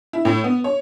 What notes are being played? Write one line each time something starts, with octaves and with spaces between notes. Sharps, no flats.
E4
A2
B3
C#5